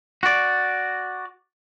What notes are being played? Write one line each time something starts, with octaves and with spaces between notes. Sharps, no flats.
F#4 D5